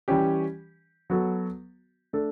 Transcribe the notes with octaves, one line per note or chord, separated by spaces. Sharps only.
E3 G3 C#4 G4
F#3 B3 F#4 A4
A3 D4 A4